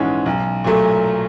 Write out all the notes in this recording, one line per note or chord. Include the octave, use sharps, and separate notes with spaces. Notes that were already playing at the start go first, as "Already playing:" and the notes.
Already playing: A#1 G#2 E3 G#3 C#4
B1
A#2 F#3 A3